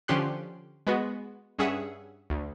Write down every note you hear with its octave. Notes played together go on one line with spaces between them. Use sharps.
D3 F3 C#4 G4 C6 F#6
G#3 B3 F#4
G2 C#4 G#4 E5 F#5
D2